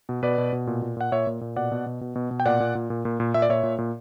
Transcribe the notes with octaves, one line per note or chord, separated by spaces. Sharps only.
B2
B2 B4 D5
B2
B2
A#2
A#2
A#2 F#5
A#2 C#5 E5
A#2
A#2
B2 D5 F#5
B2
B2
B2
B2
B2
G5
A#2 D5 F#5
A#2
A#2
A#2
A#2
A#2
A#2 E5
D5
A#2 C#5 E5
A#2
A#2